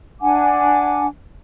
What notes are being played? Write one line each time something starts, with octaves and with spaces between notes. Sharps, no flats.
D4 F#5 G#5 D6